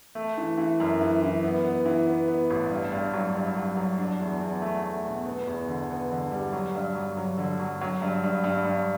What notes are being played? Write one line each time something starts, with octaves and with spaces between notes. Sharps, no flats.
A3
E3
E3
F#2
E3
E3
B3
B3
E3
B3
B3
A1
G2
G2
F#3
G2
F#3
F#3
D4
E2
E2
A3
A3
B2
B3
E2
D3
B3
D3
G3
F#3
G2
F#3
F#3
D3
F#3
F#3
G2
G2
G2
G2